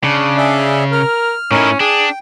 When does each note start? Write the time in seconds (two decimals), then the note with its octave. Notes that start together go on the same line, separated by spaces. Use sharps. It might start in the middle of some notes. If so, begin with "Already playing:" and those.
0.04 C#3 D4
0.38 G#4 D5 E5
0.92 A#4 F6
1.51 A2 C#4 D#4 E4 A#4
1.80 D4 G#4 G5